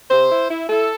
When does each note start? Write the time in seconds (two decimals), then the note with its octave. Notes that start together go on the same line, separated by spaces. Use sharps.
0.10 C3 C5
0.30 E4
0.49 E4
0.68 E4 A4